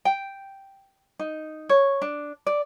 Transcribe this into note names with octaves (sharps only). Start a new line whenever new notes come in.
G5
D#4
C#5
D4
D5